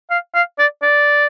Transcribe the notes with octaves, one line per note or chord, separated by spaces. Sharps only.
F5
F5
D5
D5